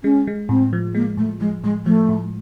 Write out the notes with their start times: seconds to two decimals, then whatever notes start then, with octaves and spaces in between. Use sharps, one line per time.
0.04 G#3 C#4
0.27 G#3
0.49 A2 C4
0.73 F3
0.95 G#3 A#3
1.17 A2 A3
1.40 F3 G#3
1.64 A2 G#3
1.86 F3 A3
2.09 A2